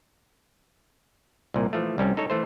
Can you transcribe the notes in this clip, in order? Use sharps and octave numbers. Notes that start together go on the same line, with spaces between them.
C2 A#2
E3 F3 A3
C2 G3 C#4
D#4 A4 C#5
E3 A3 C5